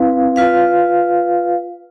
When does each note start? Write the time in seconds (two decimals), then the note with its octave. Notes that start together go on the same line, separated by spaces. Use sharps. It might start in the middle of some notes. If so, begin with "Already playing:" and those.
Already playing: C4 E4 B4 F5
0.36 F4 B4 F5